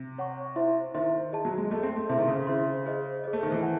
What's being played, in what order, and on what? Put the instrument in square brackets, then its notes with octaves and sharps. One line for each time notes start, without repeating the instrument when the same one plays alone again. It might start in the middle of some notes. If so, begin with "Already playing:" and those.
Already playing: [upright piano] C3
[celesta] C#5 F#5 C#6
E4 C5 E5 C6
[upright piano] D#3 [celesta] E4 C5 E5 C6
[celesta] G#4 D#5 A5
[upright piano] F#3
G#3
[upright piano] A3 [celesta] G#4 D#5 A5
[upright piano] C4
A3
[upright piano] C3 [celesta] E4 G#4 C5 E5 C6
[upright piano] D#3
C#3
[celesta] E4 G#4 C5 E5 C6
G#4 C5 D#5
G#4 C5 D#5
[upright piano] A3
D#3
E3
[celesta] C5 F#5 A5